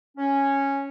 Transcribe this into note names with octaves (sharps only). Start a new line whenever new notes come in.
C#4